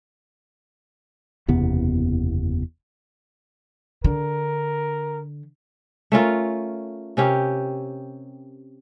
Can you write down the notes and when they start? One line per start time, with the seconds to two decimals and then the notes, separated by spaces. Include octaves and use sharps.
1.48 F#1 E2 C3 B3
4.04 D3 A#4
6.12 A3 C#4 F4 A#4
7.17 C3 C#4 G4 A#4